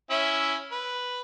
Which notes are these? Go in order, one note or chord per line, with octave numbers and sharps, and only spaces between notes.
C#4 E4 E5
B4